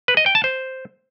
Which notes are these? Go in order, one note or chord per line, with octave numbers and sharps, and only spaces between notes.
B4
D#5
G5
A5
C5